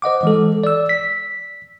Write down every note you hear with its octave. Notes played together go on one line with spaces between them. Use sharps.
C5 D#5 F#5 D6
E3 G#3 A4
D5 E6
B6